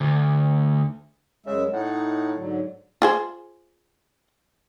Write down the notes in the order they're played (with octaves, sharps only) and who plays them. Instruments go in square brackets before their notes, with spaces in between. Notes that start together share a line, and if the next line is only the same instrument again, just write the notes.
[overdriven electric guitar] D2
[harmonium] F#2 G#3 E5 [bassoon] C#3
[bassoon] A2 [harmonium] D#4 F#5
[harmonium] G#2 D3 F#3
[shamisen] F4 G#4 C5